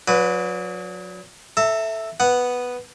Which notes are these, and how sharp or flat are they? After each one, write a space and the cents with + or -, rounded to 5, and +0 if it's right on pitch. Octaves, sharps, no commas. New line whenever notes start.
F#3 -35 D4 -40 B4 +0
A4 +0 E5 +0 A#5 -45
B3 +0 F#5 +0